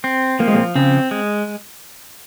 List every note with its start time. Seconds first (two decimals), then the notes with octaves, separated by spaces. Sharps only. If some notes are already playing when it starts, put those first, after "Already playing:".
0.04 C4
0.39 F3 A#3
0.48 G#3
0.54 A#2 A#3
0.75 C#3 C4
1.11 G#3